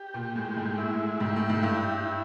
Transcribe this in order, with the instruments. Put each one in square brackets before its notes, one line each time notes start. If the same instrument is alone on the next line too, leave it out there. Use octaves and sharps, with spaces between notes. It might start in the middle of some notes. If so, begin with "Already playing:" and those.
Already playing: [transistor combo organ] G4
[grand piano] A#2
[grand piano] A2 [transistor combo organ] G#3
[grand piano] G#2
[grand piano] A2 [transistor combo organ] E4
[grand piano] G#2 [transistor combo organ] G4
[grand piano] A2
G#2
[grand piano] G2 [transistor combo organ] E4
[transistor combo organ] E4